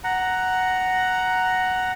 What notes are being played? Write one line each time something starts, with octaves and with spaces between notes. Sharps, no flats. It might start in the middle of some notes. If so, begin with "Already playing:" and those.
F#5 A#5